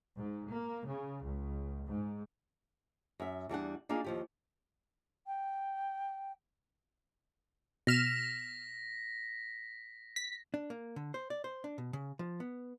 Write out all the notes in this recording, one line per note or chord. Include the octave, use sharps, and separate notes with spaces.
G#2
A#3
C#3
C#2
G#2
F#2 E5
E2 G3 D4 F#5
A#3 D4 D#4 F4 G#4
D#2 F3 G4
G5
B2 F6 A#6 B6 E7
B6
D4
A#3
D3
C5
D5
C5
D4
B2
C#3
F3
B3